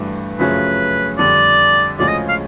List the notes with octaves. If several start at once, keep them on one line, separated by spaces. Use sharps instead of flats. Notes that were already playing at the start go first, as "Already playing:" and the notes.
Already playing: G2 E3 A3 D4 F#4
F#2 C#3 F3 A3 C#4 B4
F2 D3 G3 D5
D2 C#3 F3 G#3 C#4 D5
D#5
F5